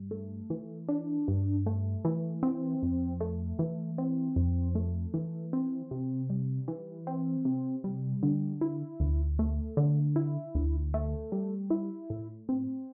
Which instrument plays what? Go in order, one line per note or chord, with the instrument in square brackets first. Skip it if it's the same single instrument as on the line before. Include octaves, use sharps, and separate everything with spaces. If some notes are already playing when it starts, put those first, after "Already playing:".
Already playing: [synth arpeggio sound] G2
A3
E3
D4
G2
A3
E3
C4
F2
A3
E3
C4
F2
A3
E3
C4
C3
G3
E3
C4
C3
G3
D3
E4
D2
A3
D3
E4
D2
A3
G3
E4
A2
C4